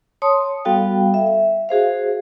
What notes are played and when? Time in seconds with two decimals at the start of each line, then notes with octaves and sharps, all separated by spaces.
0.22 C#5 A5 C6 D#6
0.65 G3 B3 F#4 A4 F5 G5
1.14 E5
1.69 F#4 G#4 C5 F5